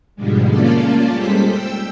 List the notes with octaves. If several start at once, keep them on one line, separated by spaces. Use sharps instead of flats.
G#2 B2 D3 F3 G3 G#3
A3 A#3 C#4 F4 A4 D5
G3 G#3 A4 C5 B6
G5 E6